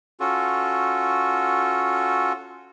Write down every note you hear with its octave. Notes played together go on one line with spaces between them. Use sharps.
C#4 F4 F#4 A4